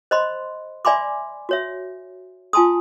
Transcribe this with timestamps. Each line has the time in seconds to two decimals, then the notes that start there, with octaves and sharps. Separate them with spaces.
0.11 C5 D#5 B5 C6
0.85 D5 E5 G#5 B5 C6 D6
1.49 F#4 C#5 E5
2.53 F4 G#5 A5 C6 D#6